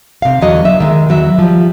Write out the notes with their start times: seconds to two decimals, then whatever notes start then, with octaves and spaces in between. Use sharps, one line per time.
0.22 C3 F5
0.41 E2 D3 F#3 D#5
0.65 E5
0.80 D#3 G#3
1.09 E2 F#3 E5
1.39 F3 G3